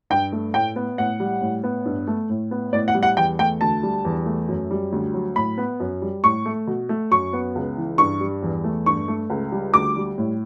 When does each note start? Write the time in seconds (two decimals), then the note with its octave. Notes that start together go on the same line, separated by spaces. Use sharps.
0.10 G2 G5
0.32 A3
0.54 A2 G5
0.76 B3
0.98 A2 F#5
1.20 G3
1.42 A2
1.64 B3
1.85 G2
2.07 A3
2.30 A2
2.51 B3
2.73 A2 D5
2.88 F#5
2.94 G3
3.03 F#5
3.17 E2 G5
3.39 A3 G5
3.61 D2 A5
3.83 G3
4.05 E2
4.26 A3
4.48 F#2
4.71 G3
4.92 D2
5.14 F#3
5.36 A2 B5
5.58 B3
5.80 F#2
6.02 G3
6.24 A2 C#6
6.46 A3
6.67 B2
6.89 A3
7.11 F#2 C#6
7.33 B3
7.55 C#2
7.77 E3
7.98 G2 C#6
8.21 G3
8.43 E2
8.64 A3
8.86 G2 C#6
9.08 A3
9.30 C#2
9.52 G3
9.74 D2 D6
9.96 G3
10.18 A2